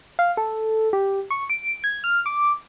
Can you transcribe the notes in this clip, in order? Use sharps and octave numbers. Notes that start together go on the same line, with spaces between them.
F5
A4
G4
C#6
D7
G#6
F6
D6